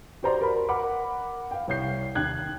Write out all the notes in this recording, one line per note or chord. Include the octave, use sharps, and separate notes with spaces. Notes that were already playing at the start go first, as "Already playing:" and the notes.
F#4 G4 C5 D5 A#5 C6
A#4 B5
A#4 F#5 B5 D6
F5 G5
C2 C#5 G6 C7
D#2 G5 F#6 G#6